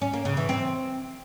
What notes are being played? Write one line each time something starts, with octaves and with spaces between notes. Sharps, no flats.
C#4
A#3
C#3
E3
C4